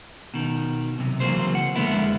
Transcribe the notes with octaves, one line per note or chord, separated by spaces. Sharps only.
B2 D#3
B1 C3
C#3 E3 F#3 A#3 C4 C5
F#5
F2 D3 G#3 A#3 B3 E4